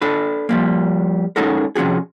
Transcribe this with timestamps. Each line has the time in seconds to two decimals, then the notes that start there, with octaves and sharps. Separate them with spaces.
0.02 D4 A4 B4
0.49 F3 G3 A#3
1.36 G#3 C#4 D#4 F#4 A4 A#4
1.75 C3 F3 C#4 F#4 G#4